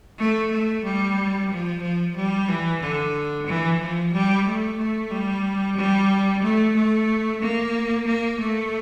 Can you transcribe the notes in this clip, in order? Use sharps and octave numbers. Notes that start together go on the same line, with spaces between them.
A3
A3
G3
F3
F3
G3
E3
D3
E3
F3
G3
A3
A3
G3
G3
A3
A3
A#3
A#3
A3